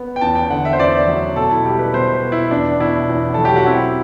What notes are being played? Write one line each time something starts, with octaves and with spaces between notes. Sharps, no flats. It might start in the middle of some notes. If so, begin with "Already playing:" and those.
Already playing: B3
G5
E2 A5
G5
D3 F#5
E5
C5
E2 D5
F#3
B2 A4
E4
G3 G4
B4
B2 C5
B4
B3
E4
E2 D4
B2 E4
E2
F#3 A4
G4
F#4
C4 E4